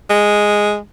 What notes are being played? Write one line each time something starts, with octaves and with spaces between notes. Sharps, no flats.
G#3